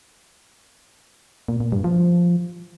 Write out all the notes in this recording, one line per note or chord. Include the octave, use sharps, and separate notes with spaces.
A#2
A#2
G2
F3